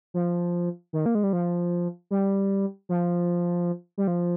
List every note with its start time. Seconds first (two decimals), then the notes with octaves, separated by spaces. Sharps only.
0.14 F3
0.93 D#3
1.06 A#3
1.15 G#3
1.23 G3
1.33 F3
2.11 G3
2.89 F3
3.98 G3
4.08 F3